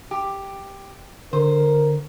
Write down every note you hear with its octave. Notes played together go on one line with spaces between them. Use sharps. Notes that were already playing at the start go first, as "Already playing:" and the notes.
G4
D3 A#4 C5